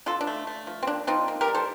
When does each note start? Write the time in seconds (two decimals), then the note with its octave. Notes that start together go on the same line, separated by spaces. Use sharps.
0.06 D3 F4 A4
0.21 D4
0.27 A3
0.47 A3
0.67 F3
0.83 C4
0.87 A#3 D4
1.07 F3 C4 D#4
1.28 A#3
1.41 G4 A#4
1.48 G3
1.55 A4 C5